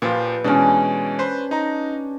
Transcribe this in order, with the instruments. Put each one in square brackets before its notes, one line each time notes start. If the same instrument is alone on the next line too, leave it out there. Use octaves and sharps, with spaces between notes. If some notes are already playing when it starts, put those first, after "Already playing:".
[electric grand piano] A#2 F3 F4 [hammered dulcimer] G4 B4
[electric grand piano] B2 E3 G#3 [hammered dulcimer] C#4 D4
[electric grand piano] B4 C5 C6
D#4 A#5